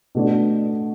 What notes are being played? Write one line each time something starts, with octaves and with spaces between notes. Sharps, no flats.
B2 A3 D4